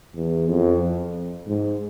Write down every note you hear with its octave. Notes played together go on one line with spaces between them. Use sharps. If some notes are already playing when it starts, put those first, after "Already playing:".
E2
F2
G#2